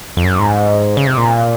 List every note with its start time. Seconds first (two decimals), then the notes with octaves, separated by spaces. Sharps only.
0.17 F2
0.24 F#2
0.40 G#2
0.97 C#3
1.07 C3
1.17 A#2